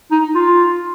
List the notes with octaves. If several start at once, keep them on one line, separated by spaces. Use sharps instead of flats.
D#4
F4